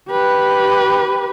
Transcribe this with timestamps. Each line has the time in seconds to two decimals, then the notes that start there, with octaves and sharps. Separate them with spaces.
0.10 G4 B4